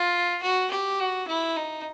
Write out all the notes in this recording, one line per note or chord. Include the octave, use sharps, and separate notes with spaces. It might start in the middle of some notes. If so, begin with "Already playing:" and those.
Already playing: F4
F#4
G4
F#4
E4
D#4